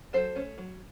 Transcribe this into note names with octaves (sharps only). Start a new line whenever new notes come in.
F#3 A4 C5
A3 C#4
F#3